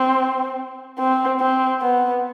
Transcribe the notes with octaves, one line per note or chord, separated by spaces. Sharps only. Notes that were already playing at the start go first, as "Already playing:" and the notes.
Already playing: C4
C4
C4
B3